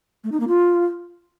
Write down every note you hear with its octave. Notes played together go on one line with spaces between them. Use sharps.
A3
D#4
A#3
F4